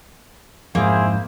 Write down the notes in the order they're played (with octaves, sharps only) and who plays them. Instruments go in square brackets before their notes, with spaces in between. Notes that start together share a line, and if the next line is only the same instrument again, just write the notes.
[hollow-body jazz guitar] F2 G#2 [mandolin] A#3 [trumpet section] E4 G#4 C5